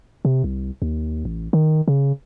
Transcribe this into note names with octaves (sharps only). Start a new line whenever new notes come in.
C3
C2
D#2
A1
D#3
C#3